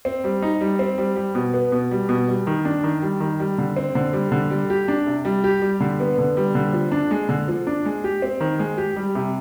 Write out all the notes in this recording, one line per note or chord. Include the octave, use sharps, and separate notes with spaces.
C4
G3
D#4
G3
C4
G3
G3
B2
B3
B2
G3
B2
G3
D#3
D4
D#3
G3
D#3
G3
D3
C4
D3
G3
D3
G3
G4
D4
C3
G3
G4
G3
D3
B3
D3
G3
D3
F3
D4
G#3
D3
F3
D4
G#3
G4
C4
D#3
G#3
G4
G3
C3